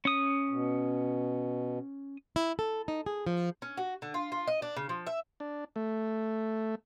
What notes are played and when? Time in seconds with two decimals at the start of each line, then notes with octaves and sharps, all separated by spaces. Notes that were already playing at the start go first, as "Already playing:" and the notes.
0.05 C#4 D#6
0.50 B2
2.36 E4
2.59 A4
2.88 D#4
3.06 G#4
3.27 F3
3.62 C#4
3.77 F#4
4.02 D3
4.14 F4
4.32 F4
4.48 D#5
4.62 D4
4.77 C#3
4.89 F3
5.07 E5
5.40 D4
5.76 A3